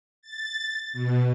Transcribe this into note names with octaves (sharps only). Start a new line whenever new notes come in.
A6
B2